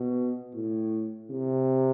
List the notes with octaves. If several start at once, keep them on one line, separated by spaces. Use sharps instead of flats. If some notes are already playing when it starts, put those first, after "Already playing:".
Already playing: B2
A2
C3